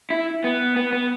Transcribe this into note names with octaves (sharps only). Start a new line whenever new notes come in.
E4
B3
B3
B3